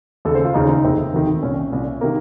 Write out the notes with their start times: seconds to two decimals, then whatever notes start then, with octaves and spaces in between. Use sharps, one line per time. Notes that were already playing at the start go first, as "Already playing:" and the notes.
0.25 D#2 C#3 A4
0.35 C5
0.45 F4
0.54 D#2 C#3 D#4
0.69 D#4
0.84 F1 D#2 D#3 C4
1.14 F1 D#2 D#3
1.42 C2 A#2 C#4
1.72 C2 A#2
2.01 C3 D#3 A#3